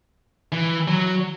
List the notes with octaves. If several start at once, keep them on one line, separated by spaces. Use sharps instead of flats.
E3
F#3